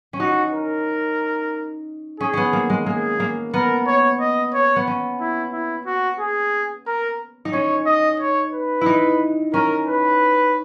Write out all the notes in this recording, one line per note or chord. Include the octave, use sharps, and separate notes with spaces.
C#4
D#4 F#4
A#4
C#4 G#4
B3 C#4
A#3
G#3
A#3 G#4
A#3
B3 A#4
C#5
D#5
C#5
B3
C#4
E4
E4
F#4
G#4
A#4
D#4
C#4 C#5
D#5
C#5
B4
D#4 E4
C#4 A#4
B4